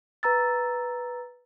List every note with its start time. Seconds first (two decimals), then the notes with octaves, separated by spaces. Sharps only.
0.23 B4 A#5 E6 A6